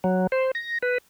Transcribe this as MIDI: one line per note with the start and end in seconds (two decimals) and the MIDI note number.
0.04 0.27 54
0.32 0.51 72
0.55 0.78 94
0.82 0.98 71